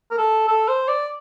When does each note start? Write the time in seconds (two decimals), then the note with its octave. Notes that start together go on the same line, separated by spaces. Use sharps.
0.11 A#4
0.18 A4
0.48 A4
0.68 C5
0.88 D5